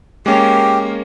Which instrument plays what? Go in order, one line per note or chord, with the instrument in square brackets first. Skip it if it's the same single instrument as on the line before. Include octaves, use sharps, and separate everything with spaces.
[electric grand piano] G#3 C#4 [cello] A#3 [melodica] G4